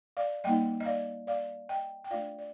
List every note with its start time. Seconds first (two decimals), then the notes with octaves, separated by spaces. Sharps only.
0.17 D5 F5
0.44 G3 A#3 D#4 D#5 G5
0.80 D#5
0.85 D5 F5
1.27 D5 F5
1.69 D#5 G5
2.04 G5
2.11 A3 D4 F4 D5 F5
2.38 D5